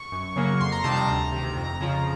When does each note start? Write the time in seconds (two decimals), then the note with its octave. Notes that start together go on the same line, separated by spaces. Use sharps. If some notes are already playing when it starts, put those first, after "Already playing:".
Already playing: C#6
0.12 F#2
0.36 C#3 F#3 A#3 C#4
0.61 F2 C6
0.72 A#5
0.84 C3 D#3 G3 A5
0.96 A#5
1.09 D2
1.32 C3 D#3
1.57 F2
1.81 C#3 F3